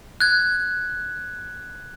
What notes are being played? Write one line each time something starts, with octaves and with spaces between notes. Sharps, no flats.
F#6 G#6